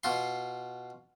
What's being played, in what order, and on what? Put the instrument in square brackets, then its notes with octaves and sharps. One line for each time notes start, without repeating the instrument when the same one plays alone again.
[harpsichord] B2 F4 C6